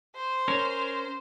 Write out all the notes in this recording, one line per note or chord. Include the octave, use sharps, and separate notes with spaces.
C5
C#4 A#4 C#5